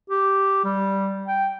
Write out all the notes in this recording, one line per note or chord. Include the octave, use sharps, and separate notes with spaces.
G4
G3
G5